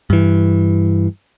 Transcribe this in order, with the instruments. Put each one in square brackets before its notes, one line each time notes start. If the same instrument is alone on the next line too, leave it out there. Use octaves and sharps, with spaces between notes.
[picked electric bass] G2 E3